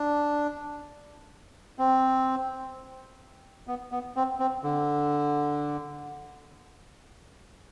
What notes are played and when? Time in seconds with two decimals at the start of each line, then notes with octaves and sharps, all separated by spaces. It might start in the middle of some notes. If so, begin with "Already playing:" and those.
Already playing: D4
1.79 C4
3.68 B3
3.92 B3
4.16 C4
4.40 C4
4.63 D3